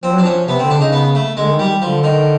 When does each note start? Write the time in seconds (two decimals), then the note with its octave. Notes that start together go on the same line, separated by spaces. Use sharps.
0.03 F3 C4
0.14 F#3
0.18 D4
0.23 F3 C#4
0.47 C3 B3
0.59 C4
0.63 D3
0.70 D4
0.77 C#3 D#4
0.92 B3
1.15 A3
1.37 D3 G#3
1.51 D#3
1.59 G3
1.82 D3 F3
2.04 D#3